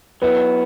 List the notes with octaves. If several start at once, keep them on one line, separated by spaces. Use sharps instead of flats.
F#3 B3 E4 B4